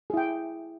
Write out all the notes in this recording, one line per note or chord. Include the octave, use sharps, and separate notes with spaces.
E4 G#4 G5